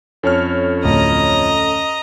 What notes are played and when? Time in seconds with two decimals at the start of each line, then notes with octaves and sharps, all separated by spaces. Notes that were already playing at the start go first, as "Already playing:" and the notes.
0.23 F2 C#4 A4 C#5 F6
0.85 D2 A2 D#5 A#5